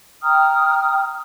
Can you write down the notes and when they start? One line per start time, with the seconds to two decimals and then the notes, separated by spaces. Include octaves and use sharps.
0.23 G5 A#5 D#6 F6